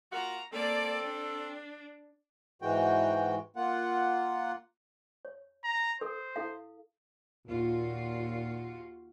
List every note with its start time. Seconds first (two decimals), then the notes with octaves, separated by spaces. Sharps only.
0.12 A#3 F4 F#4 A#5
0.53 A#3 C4 A4 D5
1.03 D4
2.62 G#2 E3 G#3 F#4 G5
3.56 A#3 F4 F#5
5.25 C#5
5.65 A#5
6.01 A4 A#4 C5
6.36 E4 A4 F5
7.47 D#2 A#2 F4 F#4